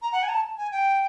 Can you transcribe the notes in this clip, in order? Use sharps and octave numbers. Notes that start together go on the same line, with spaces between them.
A#5
F#5
G#5
A#5
A5
G#5
G5